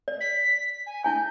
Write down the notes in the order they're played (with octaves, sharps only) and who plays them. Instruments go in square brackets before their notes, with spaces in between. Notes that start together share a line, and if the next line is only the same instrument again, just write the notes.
[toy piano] D5
[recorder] B6
G#5
[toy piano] D4 E4 G#5 [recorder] G6